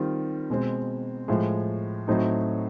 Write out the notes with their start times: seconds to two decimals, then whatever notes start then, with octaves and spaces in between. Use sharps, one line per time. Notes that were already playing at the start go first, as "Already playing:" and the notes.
Already playing: D#3 G3 C4 F4
0.50 B2 G#3 C4
1.28 A2 F3 G#3
2.08 A2 F#3 A3 C4 D#4